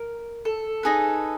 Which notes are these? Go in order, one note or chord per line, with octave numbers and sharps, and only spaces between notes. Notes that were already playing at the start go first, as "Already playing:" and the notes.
Already playing: A#4
A4
D#4 G#4 B4